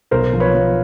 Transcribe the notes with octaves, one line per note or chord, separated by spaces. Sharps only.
B1 A#4 C5
F3
B4 C#5
F3